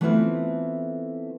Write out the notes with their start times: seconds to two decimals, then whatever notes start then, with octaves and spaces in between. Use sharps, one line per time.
0.01 E3 A3 B3 C4 E4 F4